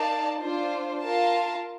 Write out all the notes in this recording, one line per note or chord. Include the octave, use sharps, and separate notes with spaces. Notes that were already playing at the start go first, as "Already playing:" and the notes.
Already playing: D#4 A#4 D5 F5 A5
D4 F4 C5
F4 A#4 F5 A5